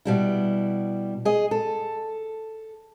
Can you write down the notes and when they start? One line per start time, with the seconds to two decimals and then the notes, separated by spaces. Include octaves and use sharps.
0.05 B2 G3 E4
1.25 G#4 D#5
1.51 A4